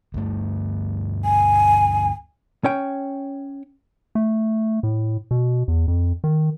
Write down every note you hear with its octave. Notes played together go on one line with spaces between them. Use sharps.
D2 G2 A3
G#5
C#4 C#5 G5
A3
A2
B2
E2
F2
D#3